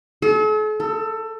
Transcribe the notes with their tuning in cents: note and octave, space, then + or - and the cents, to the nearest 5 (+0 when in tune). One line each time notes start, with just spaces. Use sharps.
A4 -45
A4 +20